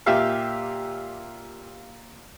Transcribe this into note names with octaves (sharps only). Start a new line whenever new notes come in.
A#2 G4 E5 F5 E6